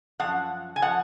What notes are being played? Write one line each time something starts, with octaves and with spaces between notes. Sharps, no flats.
F#2 F3 F#5
G#5
F3 F#5